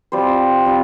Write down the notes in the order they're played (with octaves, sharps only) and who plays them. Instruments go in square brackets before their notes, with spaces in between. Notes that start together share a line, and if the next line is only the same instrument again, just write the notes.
[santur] G3 C4 F4 C5
G3 C4 F4